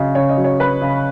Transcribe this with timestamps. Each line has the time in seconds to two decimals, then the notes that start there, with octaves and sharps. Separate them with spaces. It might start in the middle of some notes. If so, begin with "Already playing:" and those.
Already playing: C#3 F#3 D#5
0.15 C#3 C#5
0.29 D#5
0.37 F#3
0.44 C#5
0.59 F#3 B4
0.81 C#3